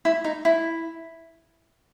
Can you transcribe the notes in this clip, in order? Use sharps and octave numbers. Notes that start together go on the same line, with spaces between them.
E4
D#4
E4